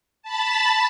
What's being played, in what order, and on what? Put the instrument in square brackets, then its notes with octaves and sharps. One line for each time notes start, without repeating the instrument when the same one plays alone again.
[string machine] A5 B5 A6